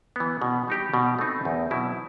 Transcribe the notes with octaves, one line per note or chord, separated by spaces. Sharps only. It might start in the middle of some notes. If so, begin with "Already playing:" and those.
E3 B3
B2
G3 D#4 G4
B2
A3 C4 D#4
E2
B2 F#3 C4 E4